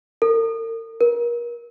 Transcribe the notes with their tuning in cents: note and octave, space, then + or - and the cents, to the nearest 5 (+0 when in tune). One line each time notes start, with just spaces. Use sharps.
A#4 -40
A#4 +35